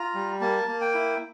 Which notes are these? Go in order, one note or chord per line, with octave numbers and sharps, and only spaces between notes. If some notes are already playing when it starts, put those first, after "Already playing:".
Already playing: F4 A#5
G3
A#3 A5
A#3
G5
E4